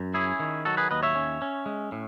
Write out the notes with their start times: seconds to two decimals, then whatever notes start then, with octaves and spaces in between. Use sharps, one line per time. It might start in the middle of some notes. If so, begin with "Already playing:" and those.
Already playing: F#2
0.14 C#4 E4 G#4
0.40 D#3
0.65 F#3 F#4 A4
0.77 G#4 B4
0.91 D#2 B4 D#5
1.03 C#5 E5
1.15 C#4
1.42 C#4
1.66 G#3
1.92 A2